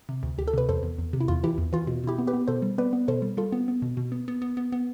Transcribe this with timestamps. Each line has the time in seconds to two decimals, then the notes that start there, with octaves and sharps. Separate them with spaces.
0.09 C3
0.23 D2
0.38 D2 G4
0.48 A4
0.54 C3 B4
0.69 E2 A4 C5
0.83 E2
0.98 E2
1.13 C3
1.21 E4
1.28 E2 F4
1.43 E3 E4 G4
1.58 E2
1.73 E3 F4
1.87 B2
2.04 B2 E4 G4
2.19 B3
2.27 G4 B4
2.33 B3
2.48 B2 A4 C5
2.62 G3
2.78 B3 B4 D5
2.93 B3
3.08 B2 A4 C5
3.22 G3
3.37 G3 F4 A4
3.52 B3
3.68 B3
3.82 B2
3.97 B2
4.12 B3
4.28 B3
4.42 B3
4.57 B3
4.72 B3